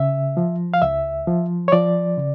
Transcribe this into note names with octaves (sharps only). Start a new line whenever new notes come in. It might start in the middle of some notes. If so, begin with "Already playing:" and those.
Already playing: C#3 E5
F3
F5
C#2 E5
F3
C#5
F3 D5
C#3